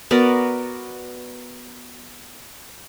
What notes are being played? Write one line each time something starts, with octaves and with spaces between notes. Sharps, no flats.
B3 F#4 A#4 D5